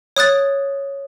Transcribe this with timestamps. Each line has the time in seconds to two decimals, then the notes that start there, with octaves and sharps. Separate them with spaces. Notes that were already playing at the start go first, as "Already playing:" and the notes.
0.17 C#5 D#6 F#6 A6